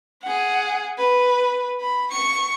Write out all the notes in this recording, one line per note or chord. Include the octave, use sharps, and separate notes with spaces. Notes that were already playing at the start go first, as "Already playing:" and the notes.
G#4 F#5
B4
B5
C#6 C#7